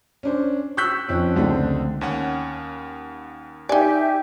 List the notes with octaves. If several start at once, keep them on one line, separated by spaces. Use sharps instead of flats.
C#4 D4 C5
C#6 E6 F#6 G6 B6
F2 C4 C#4
C#2 D3 A3 C4
D#2 C#4 F#5
D#4 G4 D5 E5 G5 G#5